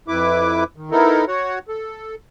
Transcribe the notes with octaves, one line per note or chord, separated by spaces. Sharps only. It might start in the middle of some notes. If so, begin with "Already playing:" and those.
F2 E4 B4 D6
D#3
B3 D#4 E4 A4 A#4
F#4 C#5 F#5
A4